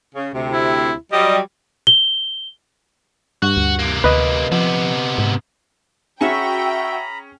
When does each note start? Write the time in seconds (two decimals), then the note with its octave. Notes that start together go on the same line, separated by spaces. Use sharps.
0.15 C#3
0.33 D2 C3
0.51 E4
1.12 F#3 G3 D#5
1.87 G7
3.42 G2 F#4 F#6
3.57 D2
3.79 C3 A#3
4.04 D2 B4 D#5
4.52 C3 F3 B3
5.18 G#2
6.21 C#4 F#4 G#4 E5 G5 A#5 B5 C#6